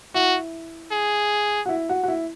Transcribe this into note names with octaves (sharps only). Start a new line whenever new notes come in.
E4 F#4
G#4
F#4
E4
F#4
F#4
E4